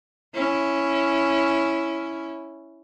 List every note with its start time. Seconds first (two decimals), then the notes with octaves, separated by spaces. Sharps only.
0.34 C#4 E4